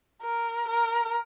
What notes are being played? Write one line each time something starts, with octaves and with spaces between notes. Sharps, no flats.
A#4
A#4